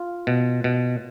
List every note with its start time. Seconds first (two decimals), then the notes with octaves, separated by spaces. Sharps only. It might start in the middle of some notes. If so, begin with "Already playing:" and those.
Already playing: F4
0.27 B2
0.64 B2